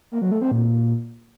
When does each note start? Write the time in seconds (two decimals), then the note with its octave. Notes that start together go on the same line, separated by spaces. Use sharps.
0.12 A#3
0.22 F#3
0.32 A3
0.41 C4
0.51 A#2